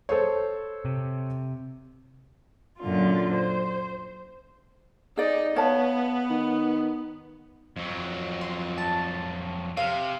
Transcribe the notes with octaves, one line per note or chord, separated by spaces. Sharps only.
A4 C5 C#5
C3
F#2 A#2 D3 F4
C5
D#4 G#4 D5
B3 C#5 F5 A5
D#3
F2 F#3
C6
A5
C3 F5